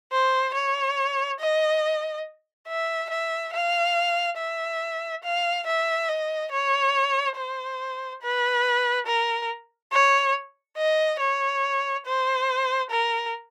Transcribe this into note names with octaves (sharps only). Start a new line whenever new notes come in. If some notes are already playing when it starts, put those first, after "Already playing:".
C5
C#5
D#5
E5
E5
F5
E5
F5
E5
D#5
C#5
C5
B4
A#4
C#5
D#5
C#5
C5
A#4